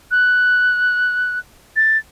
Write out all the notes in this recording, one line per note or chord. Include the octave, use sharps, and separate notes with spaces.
F#6
A6